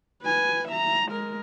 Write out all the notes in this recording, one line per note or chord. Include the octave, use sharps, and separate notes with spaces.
B4 G#5
E5 A#5
G#3 A#4